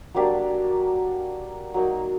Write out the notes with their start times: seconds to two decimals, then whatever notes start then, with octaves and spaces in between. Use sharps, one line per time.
0.15 F#3 A#3 D4 G4
1.74 F#3 A#3 D#4